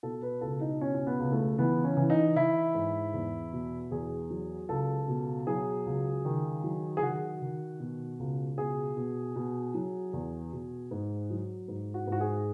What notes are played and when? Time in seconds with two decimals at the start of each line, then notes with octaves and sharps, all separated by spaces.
0.03 B2 A4
0.22 B4
0.41 C#2 A4
0.61 D#4
0.81 B2 C#4
0.94 C#4
1.07 B3
1.20 C#2
1.32 A3
1.58 E3 B3
1.84 C#4
1.97 E3
2.10 D#4
2.36 E3 E4
2.75 G#2
3.14 E2
3.53 B2
3.91 E2 G#4
4.30 F#3
4.69 C#2 A4
5.08 B2
5.47 F#3 G#4
5.86 C#2
6.25 D#3
6.64 F#3
6.97 G#4
7.03 D#3 F#4
7.42 D#3
7.80 B2
8.20 C#2
8.58 B2 G#4
8.97 B2
9.36 B2
9.74 F#3
10.13 E2
10.52 B2
10.91 G#2
11.30 F#3
11.68 G#2
11.94 F#4
12.07 G#2 F#4
12.21 G#4